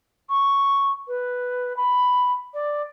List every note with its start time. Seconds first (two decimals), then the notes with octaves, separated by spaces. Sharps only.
0.29 C#6
1.08 B4
1.77 B5
2.54 D5